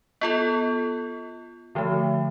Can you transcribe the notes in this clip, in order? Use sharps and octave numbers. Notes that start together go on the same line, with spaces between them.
B3 F4 A4
D3 F3 A3